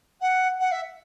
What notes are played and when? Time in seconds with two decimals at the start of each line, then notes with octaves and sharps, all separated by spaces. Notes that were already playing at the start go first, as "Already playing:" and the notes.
0.20 F#5
0.59 F#5
0.71 E5